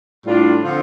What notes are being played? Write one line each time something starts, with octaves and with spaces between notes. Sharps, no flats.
A2 G3 D4 F4
D3 F3 C4 F4 A4